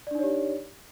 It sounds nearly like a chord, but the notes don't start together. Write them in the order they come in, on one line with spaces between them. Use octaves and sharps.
D5 D4 D#4 C#5 G4